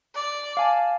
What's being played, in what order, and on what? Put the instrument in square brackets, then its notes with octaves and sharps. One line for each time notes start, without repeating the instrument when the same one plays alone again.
[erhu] D5
[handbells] F5 G#5 A5